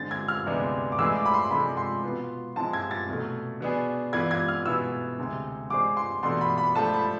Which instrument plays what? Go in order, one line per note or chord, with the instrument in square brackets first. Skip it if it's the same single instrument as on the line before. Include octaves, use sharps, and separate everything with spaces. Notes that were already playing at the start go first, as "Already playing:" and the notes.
Already playing: [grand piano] D3 G#3 C4 [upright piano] A6
[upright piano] G#6
F6
[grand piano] D2 C3 G#3 B3 D4
[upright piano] D6
[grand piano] A2 G#3 D4 G#4 B4 [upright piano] E6
[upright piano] D6
B5
C6
[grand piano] C3 F3 G#3 D4 A4 [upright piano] B5
[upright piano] C6
[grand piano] B2 B3 F4 B4
[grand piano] F3 G#3 C4 E4 [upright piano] A5
[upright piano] G#6
A6
[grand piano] C2 B2 A3
B2 B3 D4 G#4
[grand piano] E3 B3 F4 B4 D5 [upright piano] G#6
[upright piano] G#6
F6
[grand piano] B2 B3 E4 G#4 [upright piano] E6
[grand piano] D2 C3 G#3
[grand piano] G#3 D4 G#4 C5 [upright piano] D6
[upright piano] C6
[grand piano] E2 B2 A3 D4 A4 [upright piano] C6
[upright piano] B5
B5
[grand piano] F3 A3 D4 [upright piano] A5
[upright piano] B5